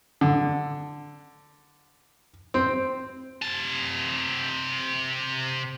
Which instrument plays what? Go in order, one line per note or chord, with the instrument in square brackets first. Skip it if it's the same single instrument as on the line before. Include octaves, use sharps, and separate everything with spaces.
[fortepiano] D3
C4
[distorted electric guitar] C3 A5